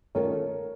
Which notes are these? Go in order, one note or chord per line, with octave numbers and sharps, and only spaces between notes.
D#3 A3 C#4 F4 A4 A#4 C#5